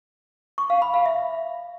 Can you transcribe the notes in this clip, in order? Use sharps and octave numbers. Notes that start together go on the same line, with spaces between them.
C#6
F5
B5
F5
E5